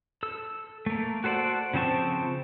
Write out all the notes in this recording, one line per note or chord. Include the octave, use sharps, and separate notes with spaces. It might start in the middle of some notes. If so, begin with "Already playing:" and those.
A4 E6
A3 A#3
F#4 A4 C5 D5 F#5
C#3 F3 C4 A5 C#6